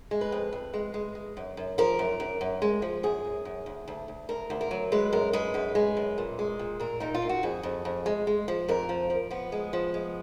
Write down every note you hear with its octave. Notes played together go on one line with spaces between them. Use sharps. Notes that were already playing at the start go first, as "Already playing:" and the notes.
G#3
B4
F2
F2
G#3
G#3
G#3
F#2
F#2
F3 A#4
F#2
F#2
F#2
G#3
F3
F#2 G#4
F#2
F#2
D2
D2
D2
D2 A#4
D2
A#4
F#3
G#3 B4
F#2 A#4
G#3 B4
F#2 B4
G#3
F#2
A#2
G#3
A#2
A#2 A#4
A#2 D#4
F4
A#2
F#4
F2 G#4
F2
F2
G#3
G#3
F3
F2 A#4
F3
F3
F3 B3
G#3
F3
G#3